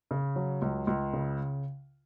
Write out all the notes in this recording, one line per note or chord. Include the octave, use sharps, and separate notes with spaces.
C#3
F#3
C#2
C#2
C#3